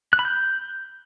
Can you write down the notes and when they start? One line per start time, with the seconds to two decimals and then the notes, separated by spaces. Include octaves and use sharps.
0.13 F#6
0.19 B5
0.25 G6